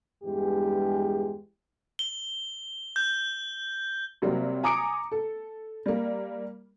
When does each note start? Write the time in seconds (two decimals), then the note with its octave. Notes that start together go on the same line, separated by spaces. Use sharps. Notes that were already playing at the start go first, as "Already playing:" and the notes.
0.24 E2 G2 G#3 G4
1.99 G7
2.96 G6
4.22 C3 F#3 G3 A#3 C4
4.63 G#5 A#5 D6 D#6 C#7 D7
5.12 A4
5.86 G3 A#3